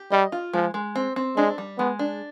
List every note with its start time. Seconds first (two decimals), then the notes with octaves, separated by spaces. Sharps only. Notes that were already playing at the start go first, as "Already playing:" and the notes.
Already playing: G4
0.11 G3 D#5
0.32 F4
0.53 F3 G#3
0.74 G#3
0.95 C4
1.16 C4
1.36 G#3 D4
1.58 G3
1.78 G#3 B3
1.99 D4